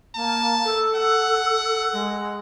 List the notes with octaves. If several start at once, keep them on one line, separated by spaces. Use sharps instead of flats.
A#3 A5
A4
F#5
G#3